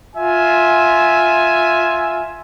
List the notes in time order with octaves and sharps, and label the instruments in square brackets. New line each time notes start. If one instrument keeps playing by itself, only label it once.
[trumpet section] F4 E5 G#5